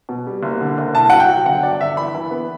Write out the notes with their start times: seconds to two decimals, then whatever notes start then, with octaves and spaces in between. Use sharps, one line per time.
0.09 B2
0.27 G3
0.43 F#1
0.61 D3
0.78 F#1
0.95 C2 A5
1.10 F#3 F#5
1.20 G5
1.28 F#3
1.45 G1 F#5
1.63 G2 D5
1.80 G1 E5
1.97 E3 B5
2.15 E3
2.31 B3